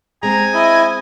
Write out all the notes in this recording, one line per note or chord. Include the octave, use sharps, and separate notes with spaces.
G#3 C4 G#5 A#5
E4 D#5